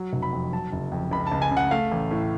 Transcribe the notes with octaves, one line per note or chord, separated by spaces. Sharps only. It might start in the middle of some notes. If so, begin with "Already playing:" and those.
Already playing: F#3
F1
B5
F2
F#3 A5
F#1
F2
C#2 B5
C#2 A5
G#5
C#3
F#5
A3 F5
A1
A2